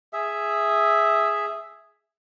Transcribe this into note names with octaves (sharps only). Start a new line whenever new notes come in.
G#4 E5